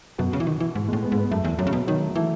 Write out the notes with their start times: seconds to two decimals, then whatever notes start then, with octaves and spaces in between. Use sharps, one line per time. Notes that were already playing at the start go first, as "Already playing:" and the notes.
0.18 F#2 B2
0.33 C#3
0.40 E3
0.47 D#3
0.60 E3
0.75 G#2
0.88 G#3
0.93 A2
1.02 B3
1.12 G#2
1.18 B3
1.31 F#2 A3
1.45 E2
1.59 F#2 F#3
1.67 C#3
1.73 B2
1.87 D#3 F#3
2.01 A3
2.16 E3 A3